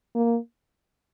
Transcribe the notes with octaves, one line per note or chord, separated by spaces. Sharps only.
A#3